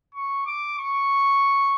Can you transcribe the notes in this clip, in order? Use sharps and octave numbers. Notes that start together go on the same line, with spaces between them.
C#6
D6
C#6